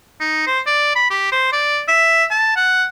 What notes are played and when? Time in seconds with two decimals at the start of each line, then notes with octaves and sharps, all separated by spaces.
0.20 D#4
0.47 C5
0.67 D5
0.96 B5
1.10 G4
1.32 C5
1.53 D5
1.88 E5
2.31 A5
2.56 F#5